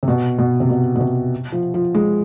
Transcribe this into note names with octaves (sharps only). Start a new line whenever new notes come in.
C3
B2
B2
C3
B2
B2
C3
F3
F3
G#3